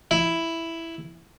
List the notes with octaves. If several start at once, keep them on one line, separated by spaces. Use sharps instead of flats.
E4